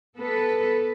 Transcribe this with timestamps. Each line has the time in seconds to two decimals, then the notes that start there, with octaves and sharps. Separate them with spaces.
0.17 B3 A4 B4